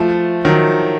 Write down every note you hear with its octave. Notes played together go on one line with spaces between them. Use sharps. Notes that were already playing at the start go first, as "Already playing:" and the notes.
Already playing: F3 A3
D#3 F#3